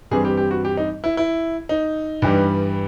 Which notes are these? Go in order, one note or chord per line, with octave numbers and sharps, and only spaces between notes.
G2 E3 G3 C4 G#4
G4
G4
F#4
G4
D#4
E4
E4
D#4
G2 E3 G3